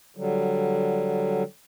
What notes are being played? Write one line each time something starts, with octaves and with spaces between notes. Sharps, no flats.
D3 F#3 G3